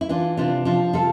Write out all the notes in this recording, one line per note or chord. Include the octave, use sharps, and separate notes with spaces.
E4
E3 D4 F4
C3 D4 F4
F3 D4 F4
C3 F4 A4